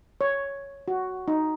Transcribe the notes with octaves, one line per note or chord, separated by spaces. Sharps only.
C#5
F#4
D#4